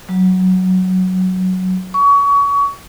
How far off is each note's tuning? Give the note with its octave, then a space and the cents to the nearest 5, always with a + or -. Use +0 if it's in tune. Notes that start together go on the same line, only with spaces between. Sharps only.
F#3 +5
C#6 +30